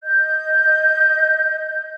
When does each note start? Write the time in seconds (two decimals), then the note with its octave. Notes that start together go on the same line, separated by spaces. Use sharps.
0.03 D#5 G6